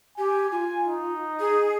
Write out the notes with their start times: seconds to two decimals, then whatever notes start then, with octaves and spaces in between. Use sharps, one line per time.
0.18 G4 G#5
0.52 F4
0.87 D#4
1.40 G#4